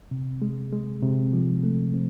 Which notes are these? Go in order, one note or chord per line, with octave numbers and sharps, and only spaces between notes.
C3
G#3
G#3
C3
F3
A3
C4